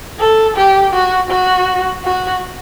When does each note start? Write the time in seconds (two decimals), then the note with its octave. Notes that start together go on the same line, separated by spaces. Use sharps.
0.20 A4
0.57 G4
0.94 F#4
1.31 F#4
2.05 F#4